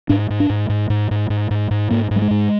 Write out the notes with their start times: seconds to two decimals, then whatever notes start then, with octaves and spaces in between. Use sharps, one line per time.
0.09 G#2 D4
0.30 G#2
0.40 D4
0.50 G#2
0.69 G#2
0.90 G#2
1.11 G#2
1.30 G#2
1.51 G#2
1.71 G#2
1.91 G#2 A#3
2.11 G#2
2.16 G3
2.22 G#3
2.31 G#2